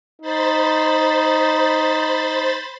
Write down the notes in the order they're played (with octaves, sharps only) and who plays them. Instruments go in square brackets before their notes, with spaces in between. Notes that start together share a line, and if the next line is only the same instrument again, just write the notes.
[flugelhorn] D#4 [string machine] C5 B5 A6